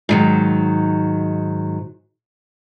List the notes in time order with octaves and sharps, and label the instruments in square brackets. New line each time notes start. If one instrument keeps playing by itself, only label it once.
[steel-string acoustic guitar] G#2 D#3 F#3